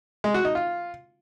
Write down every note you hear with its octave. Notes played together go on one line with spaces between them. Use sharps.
G#3
F#4
D#4
F4